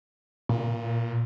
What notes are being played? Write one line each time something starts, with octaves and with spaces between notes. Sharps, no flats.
A#2